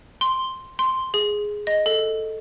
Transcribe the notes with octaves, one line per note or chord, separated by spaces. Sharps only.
C6
C6
G#4
D#5
A4